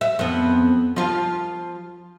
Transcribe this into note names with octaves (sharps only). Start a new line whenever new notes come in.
E5
F2 B3
F3 F4